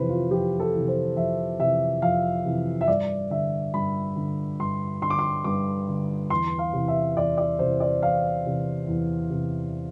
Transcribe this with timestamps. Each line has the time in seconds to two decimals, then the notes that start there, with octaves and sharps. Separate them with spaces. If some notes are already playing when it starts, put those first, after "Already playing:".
Already playing: F2 C3 E3 B4 C5
0.09 F4
0.31 F2 G4
0.60 A4
0.74 C3 E3
0.88 C5
1.17 F2 E5
1.59 C3 E3 E5
2.02 F2 F5
2.45 C3 E3
2.81 E5
2.87 G2 D5
3.30 D3 E5
3.74 G2 B5
4.16 D3
4.60 G2 C6
5.02 D3 C6
5.10 D6
5.19 C6
5.44 G2 D6
5.88 D3
6.30 E2 C6
6.59 F5
6.73 C3 E3
6.88 E5
7.16 E2 D5
7.38 D5
7.59 C3 E3 C5
7.80 D5
8.01 E2 F5
8.45 C3 E3
8.87 E2
9.30 C3 E3